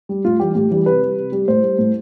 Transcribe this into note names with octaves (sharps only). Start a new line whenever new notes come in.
G3
A2 F4
E3 G3 G4
A2 G4
E3 G3
C3 B4
G3
C3
G3
A2 C5
G3
A2